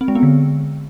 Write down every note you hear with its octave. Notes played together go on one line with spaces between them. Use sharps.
C4
G#3
B3
D3